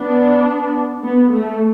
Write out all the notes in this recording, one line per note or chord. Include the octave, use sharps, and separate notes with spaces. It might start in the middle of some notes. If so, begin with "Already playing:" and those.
Already playing: B3 D4
B3
A3